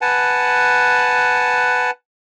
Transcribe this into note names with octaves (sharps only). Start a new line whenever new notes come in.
B4 F#5 G#5 A5